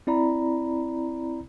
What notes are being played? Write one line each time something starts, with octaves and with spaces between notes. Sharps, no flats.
C4 E4 D5 A#5 B5